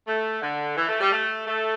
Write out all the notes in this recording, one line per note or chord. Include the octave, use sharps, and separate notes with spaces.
A3
D3
E3
A3
G3
A3
A3